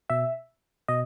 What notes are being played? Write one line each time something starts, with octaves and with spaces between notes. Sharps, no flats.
B2 E5
B2 D#5